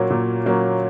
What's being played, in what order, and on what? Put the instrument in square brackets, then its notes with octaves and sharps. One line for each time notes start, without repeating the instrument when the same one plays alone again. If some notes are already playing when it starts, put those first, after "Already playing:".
Already playing: [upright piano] A#2 F#3 A#3 C#4
A#2
F#3 A#3 C#4